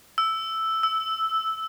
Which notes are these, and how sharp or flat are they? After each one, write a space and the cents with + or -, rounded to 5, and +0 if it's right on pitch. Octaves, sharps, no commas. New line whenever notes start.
E6 +0
E6 -10